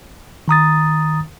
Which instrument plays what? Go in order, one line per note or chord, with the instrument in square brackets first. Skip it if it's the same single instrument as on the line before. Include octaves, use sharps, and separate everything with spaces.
[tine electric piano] D#3 A#5 D#6 A6